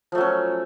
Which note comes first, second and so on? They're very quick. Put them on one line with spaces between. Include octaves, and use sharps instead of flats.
F3 A3 F#3 C#4